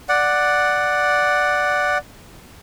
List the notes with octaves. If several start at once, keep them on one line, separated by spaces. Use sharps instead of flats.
D5 F#5